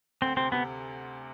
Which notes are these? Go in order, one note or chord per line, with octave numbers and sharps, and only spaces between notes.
D2 C4
C3 C4
C3 B3